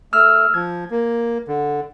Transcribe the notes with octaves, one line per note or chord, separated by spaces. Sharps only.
A3 E6 F6
F3 G#6
A#3
D3